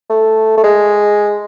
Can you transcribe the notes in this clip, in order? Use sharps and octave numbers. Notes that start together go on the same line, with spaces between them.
A3
A3
G#3